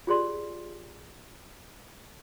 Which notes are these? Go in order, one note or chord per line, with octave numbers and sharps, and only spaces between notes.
F4 G4 G#4 C5 D5 C6